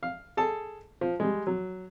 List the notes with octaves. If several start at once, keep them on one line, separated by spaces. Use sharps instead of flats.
F5
G#4 A4 A5
F3
G3 G#3
F#3